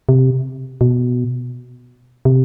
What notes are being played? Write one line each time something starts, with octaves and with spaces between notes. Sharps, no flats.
C3
B2
C3